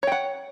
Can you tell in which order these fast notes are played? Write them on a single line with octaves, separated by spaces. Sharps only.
C#5 G5 F#5